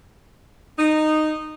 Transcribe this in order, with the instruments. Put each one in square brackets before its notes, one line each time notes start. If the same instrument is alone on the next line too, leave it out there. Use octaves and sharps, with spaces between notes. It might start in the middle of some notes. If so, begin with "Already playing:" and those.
[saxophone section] D#4